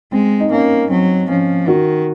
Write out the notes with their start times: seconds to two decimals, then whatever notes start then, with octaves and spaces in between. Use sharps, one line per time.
0.12 G#3 C4
0.40 D#4
0.51 A#3 C#4
0.90 F#3 C4
1.29 F3 C#4
1.67 D#3 F#4